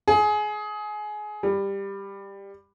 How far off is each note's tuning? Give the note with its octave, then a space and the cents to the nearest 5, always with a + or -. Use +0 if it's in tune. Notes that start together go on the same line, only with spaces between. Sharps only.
G#4 +20
G3 +15